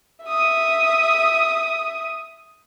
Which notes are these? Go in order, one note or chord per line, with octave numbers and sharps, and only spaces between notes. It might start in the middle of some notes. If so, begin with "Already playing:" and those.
E5 D#6